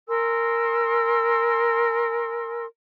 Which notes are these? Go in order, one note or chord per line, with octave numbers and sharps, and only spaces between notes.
A#4 G#5 C6 E6